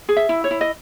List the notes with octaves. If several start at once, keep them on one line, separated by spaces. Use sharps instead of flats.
G#4
E5
E4
C#5
E4
D#5